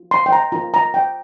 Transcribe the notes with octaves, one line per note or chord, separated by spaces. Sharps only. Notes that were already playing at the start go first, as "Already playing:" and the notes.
Already playing: F4
C6
G5
A#5
F4 A#4 A#5
A#5
G5